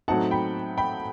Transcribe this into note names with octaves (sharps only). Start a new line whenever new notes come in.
A2 F#3 C4 D#4 F#5 A5
G5 B5
G5 B5